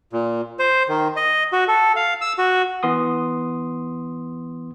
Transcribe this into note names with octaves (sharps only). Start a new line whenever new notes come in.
A#2
C5
D#3
D#5
F#4
A4
F5
E6
F#4
E3 B3 C6 D#6